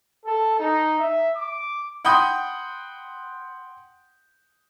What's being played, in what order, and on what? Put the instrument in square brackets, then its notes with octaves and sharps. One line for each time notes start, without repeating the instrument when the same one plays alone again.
[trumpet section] A4
D#4
E5
D6
[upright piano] F#5 G5 B5 C6 D#6 G6